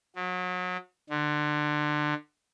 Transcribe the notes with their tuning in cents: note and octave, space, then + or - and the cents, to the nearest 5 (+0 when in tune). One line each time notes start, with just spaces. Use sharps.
F#3 -30
D3 +25